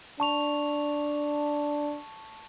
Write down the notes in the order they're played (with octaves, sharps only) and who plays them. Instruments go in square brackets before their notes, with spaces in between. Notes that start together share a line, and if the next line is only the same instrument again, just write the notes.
[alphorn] D4 [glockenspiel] A5 C#6 F7